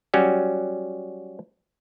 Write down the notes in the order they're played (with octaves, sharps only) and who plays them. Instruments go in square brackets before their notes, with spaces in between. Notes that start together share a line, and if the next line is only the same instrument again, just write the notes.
[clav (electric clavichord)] F#3 G3 C#4 F#4